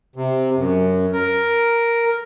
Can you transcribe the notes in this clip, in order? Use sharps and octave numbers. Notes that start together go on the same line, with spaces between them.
C3
F#2
A#4